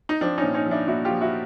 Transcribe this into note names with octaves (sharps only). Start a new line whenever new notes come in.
D#4
F3 C4 D4
C#4 D#4
A#2
C#4 D#4
F3
D4 E4
A#2 E4 F#4
F4 G4
F3
E4 F#4